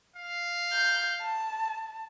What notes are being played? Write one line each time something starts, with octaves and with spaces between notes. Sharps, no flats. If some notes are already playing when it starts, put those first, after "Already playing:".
F5
G6
A5